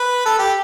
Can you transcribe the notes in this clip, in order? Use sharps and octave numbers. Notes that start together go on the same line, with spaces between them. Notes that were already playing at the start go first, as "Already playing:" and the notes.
Already playing: B4
A4
G4